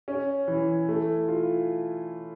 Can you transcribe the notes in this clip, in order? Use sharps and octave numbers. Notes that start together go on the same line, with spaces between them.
C#4
E3
A3
F4